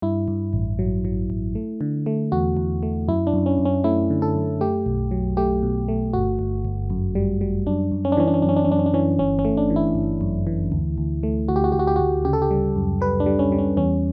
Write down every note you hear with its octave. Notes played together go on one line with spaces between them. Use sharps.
G2 E4
G2
A1
F#3
F#3
A1
A3
D3
A3
E2 F#4
E2
A3
F#2 E4
D4
F#2
C#4
F#2
C#4
A3 E4
D3
A4
F#2
A3 G4
B1
F#3
A3 G4
B2
A3
G1 F#4
G1
G1
F#2
G3
G3
F#2 D4
F#2
C#4
D4
E3 C#4
D4
C#4
F#2 D4
C#4
D4
C#4
F#2 D4
C#4
D4
E3 C#4
G1 C#4
C#4
A3
D4
E3
E4
G1
F#2
E3
D2
D2
A3
D2 F#4
G4
F#4
D2 G4
F#4
G4
D2 F#4
C#3 G4
A4
G4
G3
F#2
G3 B4
D4
G3
C#4
G3
C#4
E2 C#4